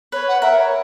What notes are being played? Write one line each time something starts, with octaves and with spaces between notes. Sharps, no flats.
B4 C#5
F#5
A#4 E5
C#5